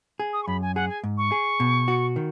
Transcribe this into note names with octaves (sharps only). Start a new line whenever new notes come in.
G#4
D#6
C#6
F#2 B5
G#5
G#4 F#5
G#5
G#2
C#6
G#4
B2
F#4
D#3